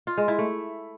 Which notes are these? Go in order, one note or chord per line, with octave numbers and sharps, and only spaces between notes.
F4
G#3
E4
A3